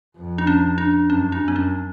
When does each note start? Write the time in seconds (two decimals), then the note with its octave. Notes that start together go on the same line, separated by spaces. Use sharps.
0.17 F2
0.38 D4
0.47 C#4
0.78 D4
1.09 F#2 C#4
1.32 D4
1.40 F#2
1.48 C4
1.56 C#4